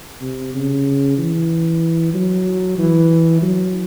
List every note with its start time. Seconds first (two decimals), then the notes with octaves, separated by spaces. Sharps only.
0.21 C3
0.54 C#3
1.18 E3
2.14 F#3
2.78 E3
3.42 F#3